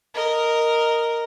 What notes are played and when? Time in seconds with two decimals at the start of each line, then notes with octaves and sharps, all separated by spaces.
0.14 A#4 D#5